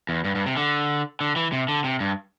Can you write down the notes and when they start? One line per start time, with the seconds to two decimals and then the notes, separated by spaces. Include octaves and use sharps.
0.09 E2
0.25 G2
0.35 G2
0.46 C3
0.57 D3
1.21 D3
1.36 E3
1.52 C3
1.68 D3
1.84 C3
2.00 G2